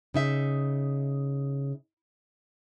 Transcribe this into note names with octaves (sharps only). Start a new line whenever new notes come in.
C#3 D#4 E5